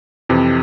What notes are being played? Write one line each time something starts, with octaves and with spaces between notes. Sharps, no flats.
F2 C3 E3